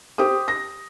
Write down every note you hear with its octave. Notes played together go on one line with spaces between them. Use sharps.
G4 C5 D#6
A#6